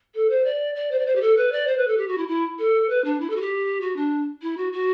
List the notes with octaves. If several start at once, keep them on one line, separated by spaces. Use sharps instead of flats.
A4
C5
D5
D5
C5
D5
C5
G4
A4
B4
D5
C5
B4
A4
G4
F#4
E4
E4
A4
B4
D4
E4
A4
F#4
G4
F#4
D4
E4
F#4
F#4